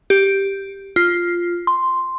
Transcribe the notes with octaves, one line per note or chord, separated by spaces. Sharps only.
G4
F4
C6